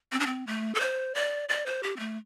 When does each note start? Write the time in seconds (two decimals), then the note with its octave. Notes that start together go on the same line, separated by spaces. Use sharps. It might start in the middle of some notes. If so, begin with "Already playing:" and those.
0.12 C4
0.20 D4
0.26 C4
0.47 A3
0.75 A4
0.80 C5
1.15 D5
1.49 D5
1.66 C5
1.83 G4
1.96 C4
2.00 A3